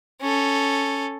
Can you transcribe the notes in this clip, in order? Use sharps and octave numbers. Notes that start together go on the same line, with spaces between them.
C#4 A4